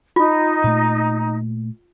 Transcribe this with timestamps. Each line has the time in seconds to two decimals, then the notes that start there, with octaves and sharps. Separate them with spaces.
0.16 D#4 F4
0.64 A#2 A3